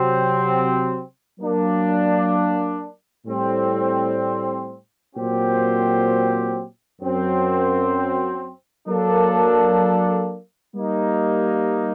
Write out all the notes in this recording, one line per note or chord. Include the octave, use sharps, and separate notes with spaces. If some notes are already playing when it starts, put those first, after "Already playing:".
Already playing: C3 F#3 C4
F#3 A#3 D4
A2 G3 C4
A#2 F#3 C4 G4 C5
F#2 F#3 C4
F#3 A#3 D4 A4
G3 A#3 D#4